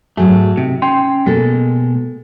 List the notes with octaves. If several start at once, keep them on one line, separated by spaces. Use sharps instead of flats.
G#2 F#3 A3 G#4
C3 D#4
C#4 G5 C6
B2 G#3 A#3 A4